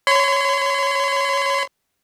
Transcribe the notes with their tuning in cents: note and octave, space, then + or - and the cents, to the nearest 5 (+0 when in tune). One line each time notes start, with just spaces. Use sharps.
C#5 +0 C6 -40